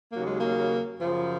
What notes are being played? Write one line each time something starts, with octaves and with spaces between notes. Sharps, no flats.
D#2 C#3 F#3 A#3
G#3
A#3
F#2 C#3 F3